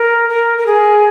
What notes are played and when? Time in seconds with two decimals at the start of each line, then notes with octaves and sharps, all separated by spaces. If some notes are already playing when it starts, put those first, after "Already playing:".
Already playing: A#4
0.29 A#4
0.58 A#4
0.66 G#4